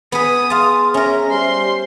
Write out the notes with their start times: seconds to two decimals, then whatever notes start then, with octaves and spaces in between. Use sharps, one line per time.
0.12 B3 G#4 B4 D#6
0.50 G#4 F5 A5 C6
0.94 C#4 A#4 E5 A#5
1.29 G3 C5 C6